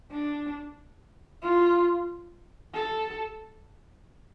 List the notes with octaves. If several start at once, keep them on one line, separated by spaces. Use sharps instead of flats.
D4
F4
A4